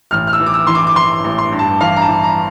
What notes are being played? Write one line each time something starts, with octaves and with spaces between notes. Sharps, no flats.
A1 F6
F6
E6
E3
D6
E6
E3 C6
D6
D6
E3 C6
A1
C6
G2
A5
E3 F5
A#5
A5
E3
A#5